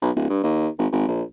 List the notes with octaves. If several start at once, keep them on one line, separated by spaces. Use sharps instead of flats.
B1
D1
G2
D#2
G#1
G#1
A#1